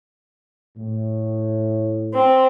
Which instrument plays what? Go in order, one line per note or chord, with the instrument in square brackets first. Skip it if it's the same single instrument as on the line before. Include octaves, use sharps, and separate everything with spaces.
[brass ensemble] A2
[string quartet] C4